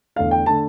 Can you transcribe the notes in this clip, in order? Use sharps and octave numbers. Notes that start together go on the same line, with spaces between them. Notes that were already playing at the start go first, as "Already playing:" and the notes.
E2 D3 A3 F5
G5
D3 A3 A5